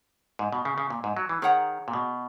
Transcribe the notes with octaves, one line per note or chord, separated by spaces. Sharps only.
G#2
B2
C#3
C#3
A#2
G#2
F#3
E3
D#3 G#4 C#5 F#5 A#5
A#2
B2